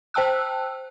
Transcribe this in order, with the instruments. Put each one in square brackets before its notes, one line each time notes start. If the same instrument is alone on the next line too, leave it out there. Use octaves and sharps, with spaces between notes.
[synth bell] C5 G5 A5 E6 F#6